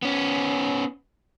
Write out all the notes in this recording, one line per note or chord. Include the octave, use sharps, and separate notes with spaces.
B3 C#4